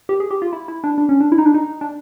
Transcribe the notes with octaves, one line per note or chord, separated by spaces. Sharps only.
G4
G#4
G4
F4
E4
E4
D4
D4
C#4
D4
E4
D#4
D4
D#4
D4